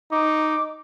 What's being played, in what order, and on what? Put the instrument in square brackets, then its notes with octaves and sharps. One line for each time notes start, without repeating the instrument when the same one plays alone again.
[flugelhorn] D#4 [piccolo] D6